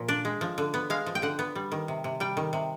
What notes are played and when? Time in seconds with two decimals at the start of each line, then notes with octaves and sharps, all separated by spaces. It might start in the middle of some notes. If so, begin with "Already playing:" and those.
Already playing: A#2 F3
0.08 D4
0.25 G#3
0.41 F3
0.58 D3
0.74 B3
0.90 G#3 F5
1.06 F3
1.15 G5
1.22 D3 F#5
1.39 B3
1.55 G3
1.72 D#3
1.88 C3
2.04 C3
2.20 G3 G5
2.37 D#3
2.53 C3